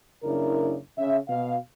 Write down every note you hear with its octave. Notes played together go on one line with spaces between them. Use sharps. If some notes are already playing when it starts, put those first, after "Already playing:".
F#1 C#3 D4 E4 A#4
C#3 E5
B2 F5